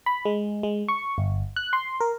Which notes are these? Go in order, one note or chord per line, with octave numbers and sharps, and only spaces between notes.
B5
G#3
G#3
C#6
G1
F#6
C6
A#4